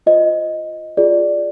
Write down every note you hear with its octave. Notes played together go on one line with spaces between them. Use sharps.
F4 C5 D#5
F4 G#4 D5